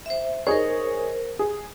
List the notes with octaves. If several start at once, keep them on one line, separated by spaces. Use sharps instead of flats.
C5 E5
D#4 G#4 A#4 C5 C#5
G#4